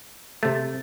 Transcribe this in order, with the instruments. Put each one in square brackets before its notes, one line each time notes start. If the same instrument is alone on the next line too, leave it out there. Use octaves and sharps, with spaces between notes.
[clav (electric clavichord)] C3 A3 [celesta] A6